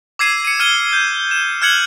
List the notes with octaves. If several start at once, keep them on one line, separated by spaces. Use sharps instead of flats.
D6 E6 G#6 C7 D#7
C#7 D#7
F6 G#6 D#7 G7
G6
E7
F6 F#6 G#6 C#7 F#7